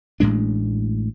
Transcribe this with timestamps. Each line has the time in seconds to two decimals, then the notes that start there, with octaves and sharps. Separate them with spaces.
0.20 A1 A2 G#3 D4